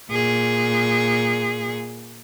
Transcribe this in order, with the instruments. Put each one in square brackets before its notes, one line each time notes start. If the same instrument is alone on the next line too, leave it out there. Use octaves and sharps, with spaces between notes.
[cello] A#2 G#4